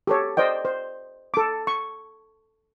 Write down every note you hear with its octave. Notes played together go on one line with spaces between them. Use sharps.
G4 A4 C#5
C5 D5 D#5 G5
C5
A4 D6
C#6